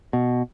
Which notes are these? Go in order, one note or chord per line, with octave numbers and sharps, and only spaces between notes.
B2